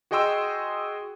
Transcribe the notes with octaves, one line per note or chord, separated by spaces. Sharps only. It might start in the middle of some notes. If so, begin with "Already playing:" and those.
F#4 G#4 D#5 G5 C6 E6